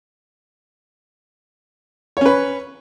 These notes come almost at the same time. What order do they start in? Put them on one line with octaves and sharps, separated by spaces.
C#5 C#4 B4